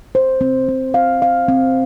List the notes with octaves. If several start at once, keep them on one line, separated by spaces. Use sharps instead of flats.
C5
C4
C4
F5
F5
C4